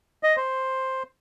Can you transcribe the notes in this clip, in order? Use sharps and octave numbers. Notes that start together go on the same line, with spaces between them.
D#5
C5